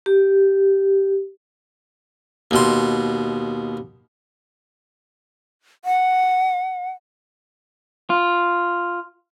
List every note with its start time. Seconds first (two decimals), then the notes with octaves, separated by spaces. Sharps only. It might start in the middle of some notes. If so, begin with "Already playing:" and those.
0.06 G4
2.51 D#2 B2 C6
5.85 F#5
8.10 F4